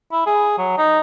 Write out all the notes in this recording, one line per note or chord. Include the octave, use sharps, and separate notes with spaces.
E4
G#4
F#3
D#4